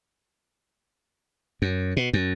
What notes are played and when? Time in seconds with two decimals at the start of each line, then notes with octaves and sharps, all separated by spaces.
1.62 F#2
1.97 B2
2.13 F#2